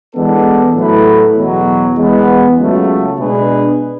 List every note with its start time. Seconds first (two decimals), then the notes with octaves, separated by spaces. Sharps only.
0.14 E3 G#3 B3 D4 A4
0.75 A2 F#3 A3 E4 B4
1.36 E2 B2 F#3
1.97 E3 G#3 B3
2.58 C#2 C#3 F#3 A3
3.18 B2 G#3 D4 G#4 B4